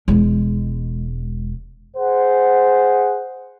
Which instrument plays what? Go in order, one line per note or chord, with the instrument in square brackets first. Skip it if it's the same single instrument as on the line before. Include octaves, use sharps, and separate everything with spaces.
[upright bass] E1 G#3
[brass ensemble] G#4 C5 F#5